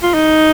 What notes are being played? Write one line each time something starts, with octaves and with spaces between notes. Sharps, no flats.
F4
D#4